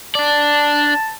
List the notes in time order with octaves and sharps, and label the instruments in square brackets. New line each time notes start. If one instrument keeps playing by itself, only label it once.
[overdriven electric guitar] D4 D5 [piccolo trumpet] A5